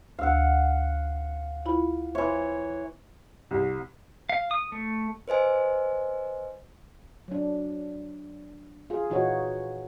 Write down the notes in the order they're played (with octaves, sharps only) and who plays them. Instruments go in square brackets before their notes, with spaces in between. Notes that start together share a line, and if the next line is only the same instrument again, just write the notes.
[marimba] D2 E6 [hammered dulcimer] F5 F#5
[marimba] E4 F4 B5
[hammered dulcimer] E3 C#5 [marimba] E5
[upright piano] C2
[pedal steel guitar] F5
D#6
A3
[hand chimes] B4 C5 D#5 G#5
[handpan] F#3 D4
F4 G#4
A#2 E3 D#4 F4 F#4 C#5